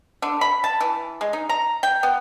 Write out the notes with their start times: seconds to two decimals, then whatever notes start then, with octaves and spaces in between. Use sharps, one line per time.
0.22 D3
0.41 B5
0.64 A5
0.81 E3
1.21 G#3
1.33 D#4
1.49 A#5
1.83 G5
2.03 B3